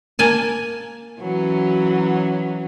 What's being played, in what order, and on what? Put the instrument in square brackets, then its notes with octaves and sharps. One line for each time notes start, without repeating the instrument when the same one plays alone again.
[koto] A#3 G#5 A5
[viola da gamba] E3 F#3 C#4